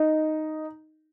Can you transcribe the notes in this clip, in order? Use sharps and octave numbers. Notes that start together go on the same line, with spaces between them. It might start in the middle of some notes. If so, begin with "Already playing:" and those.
Already playing: D#4